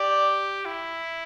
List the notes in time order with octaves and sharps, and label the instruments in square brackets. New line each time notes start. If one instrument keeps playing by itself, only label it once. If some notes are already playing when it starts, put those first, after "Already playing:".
Already playing: [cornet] G4 [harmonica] D5
[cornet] E4